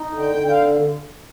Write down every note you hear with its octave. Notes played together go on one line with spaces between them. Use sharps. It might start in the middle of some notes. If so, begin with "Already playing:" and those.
Already playing: D#4
D3
G5
D3
G5
F5